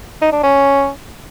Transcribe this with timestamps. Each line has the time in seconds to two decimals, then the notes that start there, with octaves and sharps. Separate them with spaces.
0.22 D#4
0.32 D4
0.43 C#4